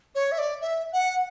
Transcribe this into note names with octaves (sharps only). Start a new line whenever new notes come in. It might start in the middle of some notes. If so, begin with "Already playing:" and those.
C#5
E5
D5
E5
F#5